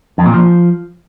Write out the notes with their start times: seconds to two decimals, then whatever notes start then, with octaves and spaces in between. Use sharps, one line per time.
0.18 F2
0.26 A#2
0.34 F3